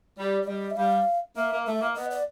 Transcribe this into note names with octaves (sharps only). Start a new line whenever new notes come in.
G3 D5
D5
G3 D#5
E5
G3 F5
A#3 E5
A#3
A3 E5
A#3
B3 D#5
D5